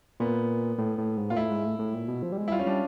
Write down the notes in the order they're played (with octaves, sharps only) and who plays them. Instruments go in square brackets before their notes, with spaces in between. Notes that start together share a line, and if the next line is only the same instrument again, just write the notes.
[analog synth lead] A#2 [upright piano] B3
[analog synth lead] A2
A2
G#2
[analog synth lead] A#2 [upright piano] F4
[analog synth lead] A2 [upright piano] E4
[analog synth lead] G#2
A2
A2
A#2
B2
F3
G3
G#3
[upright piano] E4
[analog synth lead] G3 [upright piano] F4
[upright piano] C#4
[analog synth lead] G3 [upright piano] D4